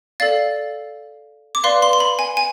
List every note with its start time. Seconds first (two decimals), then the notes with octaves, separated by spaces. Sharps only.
0.20 A4 D5 F5 A6
1.55 D6
1.64 B4 D5 F5 C6
1.82 C6
1.93 C6
2.00 B5
2.19 G#5
2.37 G#5